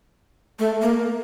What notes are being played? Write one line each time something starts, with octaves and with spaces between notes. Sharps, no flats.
A3
A#3